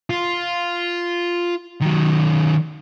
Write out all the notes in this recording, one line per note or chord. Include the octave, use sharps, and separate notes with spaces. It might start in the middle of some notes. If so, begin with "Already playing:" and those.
F4
D#3 F#3